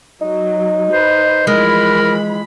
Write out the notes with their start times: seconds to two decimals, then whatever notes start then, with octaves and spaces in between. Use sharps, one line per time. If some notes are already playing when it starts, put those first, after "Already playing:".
0.21 F#3 D#4
0.92 B4 C5
1.47 E3 F3 G#3 A#4 B5